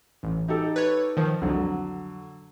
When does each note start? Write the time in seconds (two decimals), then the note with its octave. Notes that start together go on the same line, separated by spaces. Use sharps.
0.23 A1
0.48 D#4 G4 A4
0.76 B4 C#5
1.17 D#3 F3
1.42 C2 F2 D3 F#3